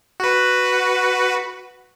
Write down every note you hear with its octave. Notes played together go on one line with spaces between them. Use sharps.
F#4 B4